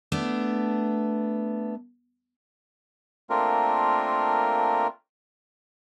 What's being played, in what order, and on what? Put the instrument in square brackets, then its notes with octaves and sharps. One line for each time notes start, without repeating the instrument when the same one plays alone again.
[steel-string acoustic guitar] A3 B3 D4
[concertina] A3 A#3 C4 D4 F4 A#4